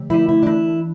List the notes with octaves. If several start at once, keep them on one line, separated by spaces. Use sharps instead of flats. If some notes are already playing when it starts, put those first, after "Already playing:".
Already playing: D3 F3 A3
F3 A3 E4
E4
D4
E3 E4